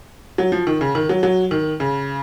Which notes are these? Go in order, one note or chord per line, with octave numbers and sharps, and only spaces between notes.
F#3
F3
D#3
C#3
D#3
F#3
F#3
D#3
C#3